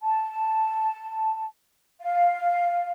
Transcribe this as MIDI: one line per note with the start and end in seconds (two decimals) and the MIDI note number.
0.01 1.45 81
2.01 2.92 77